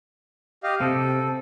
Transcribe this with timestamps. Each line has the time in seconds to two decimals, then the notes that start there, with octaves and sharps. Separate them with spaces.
0.63 G4 D#5 F5
0.81 C3 A4